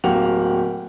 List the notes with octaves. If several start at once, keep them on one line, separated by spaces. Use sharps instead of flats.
D1 A#3 G4 F#5 F7